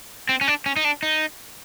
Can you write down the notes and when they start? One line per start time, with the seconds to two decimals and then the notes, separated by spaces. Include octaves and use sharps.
0.29 C4
0.41 C#4
0.48 D4
0.66 C#4
0.76 D#4
0.84 D4
1.03 D#4